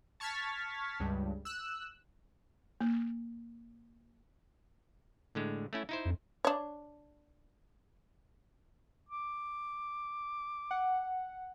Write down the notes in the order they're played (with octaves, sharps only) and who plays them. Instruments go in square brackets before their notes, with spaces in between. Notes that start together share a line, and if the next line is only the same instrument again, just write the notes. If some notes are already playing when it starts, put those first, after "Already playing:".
[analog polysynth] A5 C#6 F6 G#6 A6 B6
C#2 G2
E6 F#6
[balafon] A#3
[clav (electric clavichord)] A2 D3 G#3
A3 C#4 E4
D#4 E4 C5
[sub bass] F2
[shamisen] D4 C#5
[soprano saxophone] D6
[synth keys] F#5